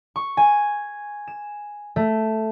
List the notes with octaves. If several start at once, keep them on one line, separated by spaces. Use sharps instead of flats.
C#6
G#5
E7
A3